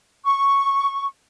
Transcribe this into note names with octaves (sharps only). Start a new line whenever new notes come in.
C#6